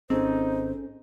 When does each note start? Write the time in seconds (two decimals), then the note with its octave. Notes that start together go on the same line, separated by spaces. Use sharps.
0.10 G#1 C4 C#4 D#4 G#4 A4 C5